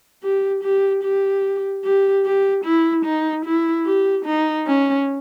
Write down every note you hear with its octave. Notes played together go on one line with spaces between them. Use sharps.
G4
G4
G4
G4
G4
E4
D#4
E4
G4
D#4
C#4